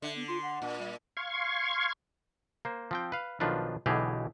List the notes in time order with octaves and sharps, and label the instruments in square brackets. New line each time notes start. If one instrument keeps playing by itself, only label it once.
[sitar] D3 [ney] E5
[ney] B3
[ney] F4 [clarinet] C6
[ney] F#5
[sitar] A#2 [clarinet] D4
[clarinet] G3 [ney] E5
[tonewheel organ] F5 C6 C#6 G#6
[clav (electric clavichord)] A#3 C5
F3 C4 G5
B4 F5
B1 D#3 F3 D4 F4 B4
B1 B2 D3 E3 G4 G#4